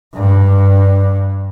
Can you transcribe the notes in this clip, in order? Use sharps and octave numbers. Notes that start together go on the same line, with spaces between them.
G2